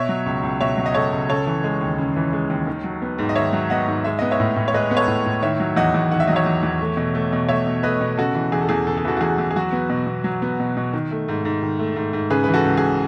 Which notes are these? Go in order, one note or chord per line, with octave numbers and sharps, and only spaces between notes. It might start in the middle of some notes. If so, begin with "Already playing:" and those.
Already playing: B2 C#5 E5
F#3
C#2
C#2
B2 C#5 E5
F#3
D#5
C#2 A4 C#5
C#2
C#3 A4 C#5
E3
G#3
D#2
C#3
E3
G#3
D#2
D#3
F#3
B3
G#2
D#5
D#3 C#5 E5
F#3
B3 D#5 F#5
G#2
G#3 E5
B3 D#5
C#5 E5
A2
A2
C#5
G#3 B4 D#5
B3
A4 C#5
A2
A2
D#3 C#5 E5
F#3
E2 D#5 F#5
E2
D#3 F#5
E5
F#3 D#5
C#5 E5
E2
E2
A3
B2
A3
B2
A3 C#5 E5
B2
A3 B4 D#5
B2
C#3 F#4 A4
E3
E2 G#4
A4
E2 G#4
C#3 A4
G#4
E3 F#4 A4
F#4
E2 G#4
E2
G#4
F#3 F#4
B3
B2
B2
F#3
B3
B2
B2
D#3
A3
G#2
G#2
D#3
A3
G#2
G#2
C#3 G#4 B4
E3 B4
F#4 A4
C#2
G#4